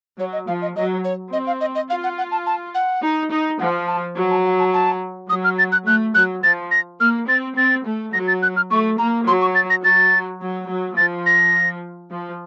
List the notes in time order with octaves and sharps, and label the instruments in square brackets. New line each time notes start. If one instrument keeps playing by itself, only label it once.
[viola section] F#3 [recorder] C#5
[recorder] D#5
[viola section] F3 [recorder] F5
[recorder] D#5
[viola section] F#3 [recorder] D#5
[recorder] C#5
[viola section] C4 [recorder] D#5
[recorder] F5
D#5
D#5
[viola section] F4 [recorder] F5
[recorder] F#5
F#5
A5
A5
F#5
[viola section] D#4
D#4
[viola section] F3 [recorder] F#5
[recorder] A5
[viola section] F#3
[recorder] A5
F#5
A5
A5
[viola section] F#3 [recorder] D#6
[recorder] F6
A6
F#6
[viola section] A3 [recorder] F#6
[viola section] F#3 [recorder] F#6
[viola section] F3 [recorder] A6
[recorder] A#6
[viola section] A#3 [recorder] F6
[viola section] C4 [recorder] A6
[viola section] C4 [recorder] A6
[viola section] A3
[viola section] F#3 [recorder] A#6
[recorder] A6
F#6
F6
[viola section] A3 [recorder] C#6
[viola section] A#3 [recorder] A#5
[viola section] F#3 [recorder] C6
[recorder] C#6
A6
A#6
[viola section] F#3 [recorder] A6
[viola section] F#3
F#3
[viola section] F3 [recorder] A6
[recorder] A#6
[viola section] F3